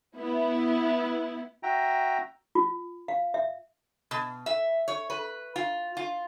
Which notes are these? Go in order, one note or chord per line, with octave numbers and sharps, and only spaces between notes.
B3 E4
F#4 E5 G5 A#5
F4
F5
E5
B2
E5
C#5
B4
F4
F4